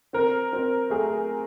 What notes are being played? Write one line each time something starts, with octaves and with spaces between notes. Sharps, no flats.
C4 A#4
C4
A3 G#4